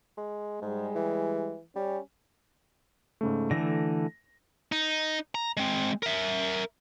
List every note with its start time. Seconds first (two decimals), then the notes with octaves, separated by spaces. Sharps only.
0.17 G#3
0.62 G#2 G3 G#3
0.95 E3
1.76 G3 C#4
3.21 G#2 C#3 A3
3.51 D3 E3 A3 A#6
4.72 D#4
5.35 A#5
5.57 G#3 C4
6.03 A#4 E5